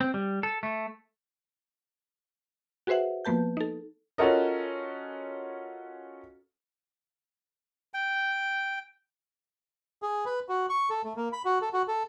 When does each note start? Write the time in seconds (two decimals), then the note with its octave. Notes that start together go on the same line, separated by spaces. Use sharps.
0.01 C4
0.14 G3
0.43 A4
0.63 A3
2.87 F#4 G#4 B4 C5 E5 F#5
3.25 F3 A#3 B3 B4 A5 G6
3.57 D#4 A4
4.18 C#4 F4 F#4 A4 A#4 D#5
7.94 G5
10.02 G#4
10.25 B4
10.49 F#4
10.69 C#6
10.90 A4
11.04 A3
11.16 A#3
11.33 B5
11.45 F#4
11.62 A4
11.73 F#4
11.88 A4